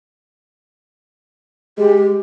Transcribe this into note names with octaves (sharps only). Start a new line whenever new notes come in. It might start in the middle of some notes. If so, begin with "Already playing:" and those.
G#3 G4